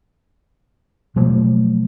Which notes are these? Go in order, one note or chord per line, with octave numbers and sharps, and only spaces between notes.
B2 F3 F#3 A3